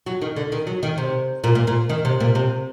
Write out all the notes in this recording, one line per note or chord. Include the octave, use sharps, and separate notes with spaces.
F#3
D#3
D3
D#3
F#3
D#3
C3
A#2
A#2
A#2
D#3
C3
A#2
C3